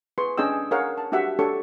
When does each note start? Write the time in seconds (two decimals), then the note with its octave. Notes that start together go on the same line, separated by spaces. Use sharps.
0.18 G#4 B4 C6 C#6
0.38 C#4 D4 G#4 D#5 G5 E6
0.71 G#4 A#4 C#5 F5 F#5
0.98 A5
1.12 D4 F#4 G4 E5 F#5
1.39 D4 G4 A4 C#5 C#6